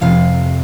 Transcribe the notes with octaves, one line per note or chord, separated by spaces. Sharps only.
F2 C3 F5